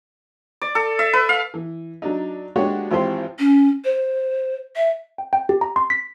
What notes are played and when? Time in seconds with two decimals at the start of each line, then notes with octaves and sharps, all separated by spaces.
0.62 D5
0.75 A4
0.99 E5
1.13 B4
1.29 F5
1.54 E3
2.02 F#3 D4 D#4
2.56 G#3 A#3 D4 F#4 G4 C#5
2.91 G#1 E3 C4 F4 G4 C5
3.39 C#4
3.84 C5
4.76 E5
5.18 G5
5.33 G5
5.49 G4
5.61 A#5
5.76 C6
5.90 B6